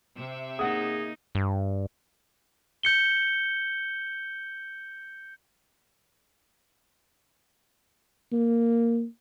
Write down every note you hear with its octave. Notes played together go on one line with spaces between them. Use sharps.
C3 E5
A#3 D#4 G#4 F#5 D#6
G2
G6 C#7 G7
A#3